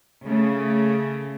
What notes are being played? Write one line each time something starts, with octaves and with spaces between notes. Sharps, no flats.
C#3 A3